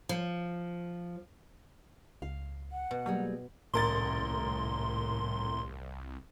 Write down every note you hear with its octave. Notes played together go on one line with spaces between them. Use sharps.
F3
C#2 F5
F#5
B2
F#3 G3 A#3 G#4
D#1 C2 A2 A#4 C6 A6